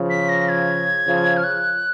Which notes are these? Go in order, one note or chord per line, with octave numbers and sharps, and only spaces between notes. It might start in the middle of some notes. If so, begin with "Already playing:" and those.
Already playing: C#3 F3
B6
A#6
G#6
C#3 F3
F6
F#6